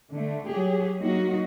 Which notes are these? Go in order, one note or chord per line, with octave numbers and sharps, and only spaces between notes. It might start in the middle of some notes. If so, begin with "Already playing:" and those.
D3 A3
F#3 G4 G#4
F#3 A#3 D#4 F#4